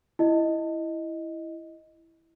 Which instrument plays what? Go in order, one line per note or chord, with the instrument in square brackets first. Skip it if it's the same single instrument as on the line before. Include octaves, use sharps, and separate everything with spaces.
[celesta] E4 D#5